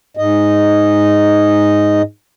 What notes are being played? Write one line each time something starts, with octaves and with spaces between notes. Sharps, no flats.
G#2 D#5